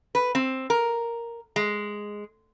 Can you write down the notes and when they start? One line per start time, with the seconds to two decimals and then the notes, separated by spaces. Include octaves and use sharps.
0.15 B4
0.35 C4
0.70 A#4
1.56 G#3